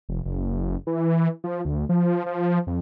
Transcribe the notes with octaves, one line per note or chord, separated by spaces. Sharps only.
F1
F#1
E3
F3
D2
F3
F3
F2